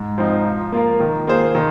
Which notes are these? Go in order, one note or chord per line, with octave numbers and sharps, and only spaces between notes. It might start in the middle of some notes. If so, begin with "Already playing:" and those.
Already playing: G#2
F3 C4 D#4
F3
A#3 F4 A#4
D#3
A#3 F4 G#4 C5
D#3